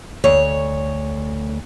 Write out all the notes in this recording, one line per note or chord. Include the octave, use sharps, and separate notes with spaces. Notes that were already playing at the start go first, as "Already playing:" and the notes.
D2 C#5